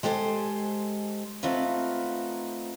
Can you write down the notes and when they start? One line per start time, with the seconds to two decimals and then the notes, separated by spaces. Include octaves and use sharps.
0.03 G#3 G4 A4 C5 G#5
1.43 A3 B3 C4 D#4 F4 B4